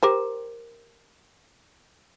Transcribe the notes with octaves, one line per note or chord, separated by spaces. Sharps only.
G4 A#4 C5